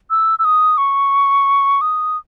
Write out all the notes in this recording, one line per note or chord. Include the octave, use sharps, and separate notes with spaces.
E6
E6
D#6
C#6
D#6